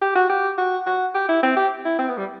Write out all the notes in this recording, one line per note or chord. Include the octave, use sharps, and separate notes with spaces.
G4
F#4
G4
F#4
F#4
G4
E4
C4
G4
E4
C4
B3
G3